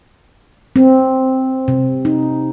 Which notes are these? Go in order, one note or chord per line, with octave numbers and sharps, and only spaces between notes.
C4
C3
D#4